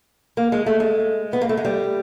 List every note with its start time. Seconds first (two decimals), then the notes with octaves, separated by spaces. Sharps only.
0.37 A#3
0.52 G#3
0.66 A3
0.80 G#3
1.33 B3
1.41 A#3
1.49 A3
1.57 G#3
1.65 G3